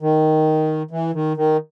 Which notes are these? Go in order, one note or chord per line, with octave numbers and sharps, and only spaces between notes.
D#3
E3
D#3
D#3